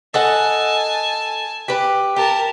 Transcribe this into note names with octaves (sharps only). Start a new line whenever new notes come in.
A4 D#5 F#5 G#5 A5
G4 B4
G4 A#4 A5